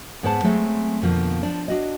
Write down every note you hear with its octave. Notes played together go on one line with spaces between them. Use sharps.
G#2 B3 B4 C5 F#5 A5
F#3 G#3 A3 C4
F2 B2 D3 F3 A#3
F3 D4
D4 F#4 D#5